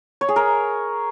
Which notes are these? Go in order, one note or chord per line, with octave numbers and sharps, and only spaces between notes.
C#5
G#4
A#4